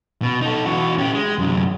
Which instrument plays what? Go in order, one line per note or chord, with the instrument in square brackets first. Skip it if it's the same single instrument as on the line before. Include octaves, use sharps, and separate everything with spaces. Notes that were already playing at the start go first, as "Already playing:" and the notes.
[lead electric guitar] B2
D#4 A4
E3 F#4
C#4 G4
G#3
F#2 C3